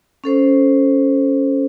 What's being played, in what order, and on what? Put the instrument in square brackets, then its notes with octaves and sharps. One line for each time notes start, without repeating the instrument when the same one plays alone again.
[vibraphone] C#4 A4 C5